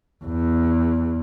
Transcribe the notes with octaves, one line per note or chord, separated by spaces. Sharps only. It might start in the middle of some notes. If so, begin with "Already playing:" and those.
E2